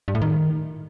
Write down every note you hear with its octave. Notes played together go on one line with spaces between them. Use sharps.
G2
A2
D#3